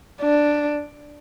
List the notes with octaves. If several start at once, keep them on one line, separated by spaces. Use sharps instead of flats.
D4